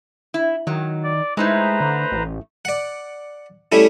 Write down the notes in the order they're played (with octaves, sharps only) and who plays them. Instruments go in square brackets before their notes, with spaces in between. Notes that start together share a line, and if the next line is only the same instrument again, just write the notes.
[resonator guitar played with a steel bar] E4
[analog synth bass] D#3 [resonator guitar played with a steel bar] F#3
[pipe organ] D5
[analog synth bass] G#3 [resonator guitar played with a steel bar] A3 D#4 E4 [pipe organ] B4 C5 A#5
[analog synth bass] D3
A1
[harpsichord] D5 F#5
G3 A3 C#4 E4